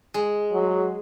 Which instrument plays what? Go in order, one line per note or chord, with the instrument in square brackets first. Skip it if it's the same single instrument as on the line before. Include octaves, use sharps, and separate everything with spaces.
[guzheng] G#3
[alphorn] F#3